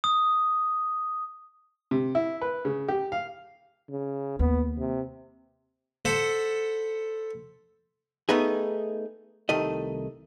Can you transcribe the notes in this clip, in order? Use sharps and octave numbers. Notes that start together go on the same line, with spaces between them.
D#6
C3
E4
B4
C#3
G4
F5
C#3
D#2 B3
C3
A4 C5 F#5 B5
A3 B3 D#4 G#4
C2 D#3 A3 D#5